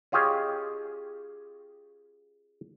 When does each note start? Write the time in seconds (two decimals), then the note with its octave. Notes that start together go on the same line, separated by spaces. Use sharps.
0.12 C#4 F4 G4 G#4 C#5 D#5